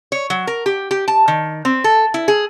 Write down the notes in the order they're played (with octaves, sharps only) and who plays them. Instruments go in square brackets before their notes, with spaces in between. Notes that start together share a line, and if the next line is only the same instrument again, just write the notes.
[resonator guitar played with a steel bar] C#5
F#3
A#4
G4
G4
A5
D#3
C4
A4
E4
G#4